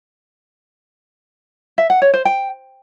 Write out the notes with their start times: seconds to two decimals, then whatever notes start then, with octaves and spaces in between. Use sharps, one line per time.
1.78 E5
1.90 F#5
2.02 C#5
2.14 C5
2.25 G5